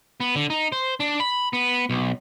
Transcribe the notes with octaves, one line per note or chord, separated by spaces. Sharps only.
B3
D3
D#4
C5
D4
B5
B3
B1